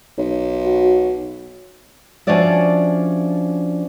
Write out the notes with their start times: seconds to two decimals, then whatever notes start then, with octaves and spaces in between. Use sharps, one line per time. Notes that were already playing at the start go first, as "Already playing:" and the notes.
0.18 B1
0.65 F#4
2.27 F3 C#4 D4 F#4 D5 E5